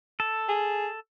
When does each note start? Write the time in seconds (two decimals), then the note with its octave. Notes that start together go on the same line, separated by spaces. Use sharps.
0.20 A4
0.48 G#4